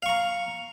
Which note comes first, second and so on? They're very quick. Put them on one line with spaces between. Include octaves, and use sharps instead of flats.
F5 C#6 A#5